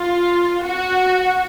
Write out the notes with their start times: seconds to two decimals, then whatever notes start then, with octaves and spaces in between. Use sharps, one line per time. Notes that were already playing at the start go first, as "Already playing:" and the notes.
Already playing: F4
0.63 F#4